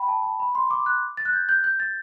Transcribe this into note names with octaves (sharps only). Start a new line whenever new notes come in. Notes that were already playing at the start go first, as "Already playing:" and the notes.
Already playing: G5 B5
A5
A5
B5
C6
D6
F#6
A6
F#6
G6
G6
G6
A6